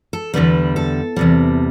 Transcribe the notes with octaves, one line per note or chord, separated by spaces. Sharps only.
A4
E2 D3 G3 B4
A4
E2 C3 G3